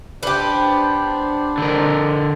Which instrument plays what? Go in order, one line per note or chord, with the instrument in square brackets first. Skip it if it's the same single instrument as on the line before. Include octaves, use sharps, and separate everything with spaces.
[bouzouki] B3 G4 [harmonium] D4 C5 D5
[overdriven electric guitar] D3 A#4